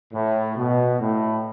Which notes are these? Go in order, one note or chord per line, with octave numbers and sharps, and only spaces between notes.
A2
B2
A2